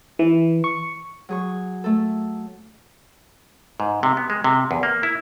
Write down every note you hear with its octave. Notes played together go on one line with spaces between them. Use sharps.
E3
C#6
F#3 G#4 C#6
A3 A4
G#2
C3
B3
G#3
C3
E2
A#3
E4